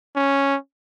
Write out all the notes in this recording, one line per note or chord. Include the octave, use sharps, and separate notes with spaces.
C#4